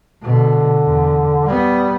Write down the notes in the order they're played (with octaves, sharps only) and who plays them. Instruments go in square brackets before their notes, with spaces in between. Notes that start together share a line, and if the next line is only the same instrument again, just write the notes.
[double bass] B2 [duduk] D3
[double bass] E2
[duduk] G3 [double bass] B3